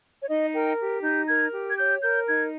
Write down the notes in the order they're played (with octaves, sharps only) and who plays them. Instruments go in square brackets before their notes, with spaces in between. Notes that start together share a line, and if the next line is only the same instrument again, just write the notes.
[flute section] C#5
D#4 D#5
A#4 G5
G4
D#4 G6
A#4 G#6
G4
G#6
C#5 G6
A#4 G6
D#4 G#6